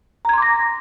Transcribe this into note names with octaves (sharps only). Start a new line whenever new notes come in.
A#5 C6 D6 G#6 A#6